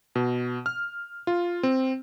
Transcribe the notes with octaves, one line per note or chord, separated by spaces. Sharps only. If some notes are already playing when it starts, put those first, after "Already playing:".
B2
F6
F4
C4